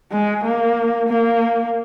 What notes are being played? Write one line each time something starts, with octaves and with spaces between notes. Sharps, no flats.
G#3
A#3
A#3